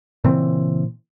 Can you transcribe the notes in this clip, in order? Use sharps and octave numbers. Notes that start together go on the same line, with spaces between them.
A#2 C#3 E3 C4